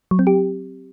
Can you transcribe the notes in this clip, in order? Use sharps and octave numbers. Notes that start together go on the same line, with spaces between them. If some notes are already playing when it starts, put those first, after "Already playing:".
F#3
C4
G4